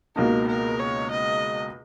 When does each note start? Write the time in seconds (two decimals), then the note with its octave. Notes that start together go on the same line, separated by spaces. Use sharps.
0.16 C#2 B2 A#3 D#4 A#4
0.48 A#4
0.79 C#5
1.11 D#5